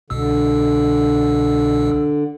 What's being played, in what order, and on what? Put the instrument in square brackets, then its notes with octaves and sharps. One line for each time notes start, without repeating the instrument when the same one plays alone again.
[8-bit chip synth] C2 B2 E6 [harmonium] D3